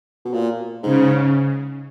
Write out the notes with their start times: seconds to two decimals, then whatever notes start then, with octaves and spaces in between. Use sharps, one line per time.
0.25 B2
0.34 A#2
0.83 G#2 C#3